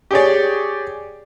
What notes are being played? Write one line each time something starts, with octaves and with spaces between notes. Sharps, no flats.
G4 G#4 C#5 D5